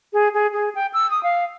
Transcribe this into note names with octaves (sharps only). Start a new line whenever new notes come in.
G#4
G#4
G#4
G5
E6
D#6
F5